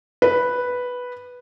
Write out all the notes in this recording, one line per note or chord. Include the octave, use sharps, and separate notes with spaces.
B4